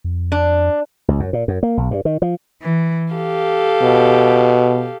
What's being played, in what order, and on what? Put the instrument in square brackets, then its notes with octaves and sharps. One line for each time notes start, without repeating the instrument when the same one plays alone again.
[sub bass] F2
[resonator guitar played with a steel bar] D4
[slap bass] C#2
F#2
A#2
F#2
A#3
B1
G2
D#3
F3
[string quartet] E3
G4 A4 F5
[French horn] B2